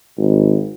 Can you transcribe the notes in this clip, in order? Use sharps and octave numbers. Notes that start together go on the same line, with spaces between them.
G#1